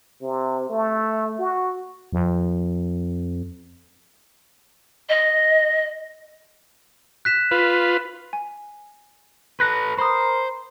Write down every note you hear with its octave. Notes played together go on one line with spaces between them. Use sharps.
C3
A3
F#4
F2
D#5
F#6 B6 E7
F4 B4
G#5
A4 B4 F#6 A#6
A#4 C5 B5 C6 D#6